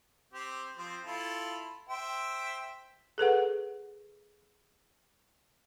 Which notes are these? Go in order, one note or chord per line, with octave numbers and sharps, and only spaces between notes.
C4 G4
F3 C4
E4 F4 A4
C5 E5 G5
G#4 A4 B4 F#5